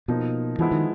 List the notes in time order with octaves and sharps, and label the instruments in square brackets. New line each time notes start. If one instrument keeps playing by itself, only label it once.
[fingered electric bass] B2 [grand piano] F3 A#3 D#4
[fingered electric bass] E3 [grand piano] F3 G#3 B3 E4
[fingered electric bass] D#3